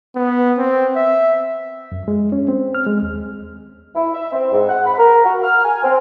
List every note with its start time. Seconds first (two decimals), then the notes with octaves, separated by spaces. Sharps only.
0.16 B3
0.58 C4
0.96 E5
1.92 F#2
2.08 G#3
2.32 C#4
2.48 C4
2.75 F6
2.86 G#3
3.03 D#2
3.95 E4
4.14 E5
4.33 C4
4.52 G#2
4.69 F#5
4.86 B5
4.98 A#4
5.24 F#4
5.43 F6
5.64 G#5
5.83 C4